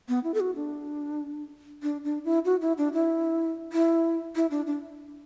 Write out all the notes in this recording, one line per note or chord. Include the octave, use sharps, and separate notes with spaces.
B3
E4
A4
F#4
D4
D4
D4
E4
F#4
E4
D4
E4
E4
E4
D4
D4